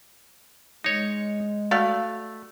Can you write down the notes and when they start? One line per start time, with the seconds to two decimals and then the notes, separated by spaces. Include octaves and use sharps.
0.84 G#3 D#4 C#5
1.71 A3 F#4 D5 F5